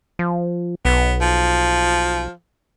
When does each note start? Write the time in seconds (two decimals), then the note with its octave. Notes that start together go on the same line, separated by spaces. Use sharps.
0.19 F3
0.85 B1 B3
1.21 F3